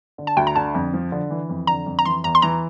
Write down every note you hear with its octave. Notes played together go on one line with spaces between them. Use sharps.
D3
A5
D2 G5
A#5
D3 A5
F2
F3
D3
E3
F2
D3 A#5
F2
A#5
E3 C6
E2 A#5
C6
E3 A#5